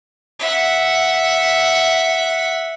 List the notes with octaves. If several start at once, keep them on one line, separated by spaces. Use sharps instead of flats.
E5 F#5